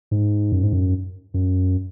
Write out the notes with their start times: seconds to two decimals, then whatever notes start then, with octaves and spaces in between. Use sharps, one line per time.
0.11 G#2
0.52 F#2
0.63 G#2
0.73 F#2
1.34 F#2